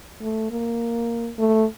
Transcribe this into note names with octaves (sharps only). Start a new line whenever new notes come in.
A3
A#3
A3